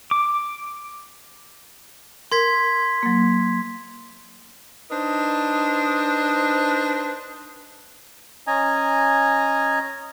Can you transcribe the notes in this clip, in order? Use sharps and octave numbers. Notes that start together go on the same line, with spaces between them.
D6
A#4 C6 G#6 B6
F#3 A#3
D4 D#4 B4 C5
C#4 D#5 G#5 A#5